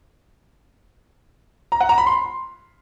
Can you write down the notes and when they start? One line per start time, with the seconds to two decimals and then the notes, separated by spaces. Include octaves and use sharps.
1.72 A#5
1.81 F#5
1.89 A#5
1.98 B5
2.06 C6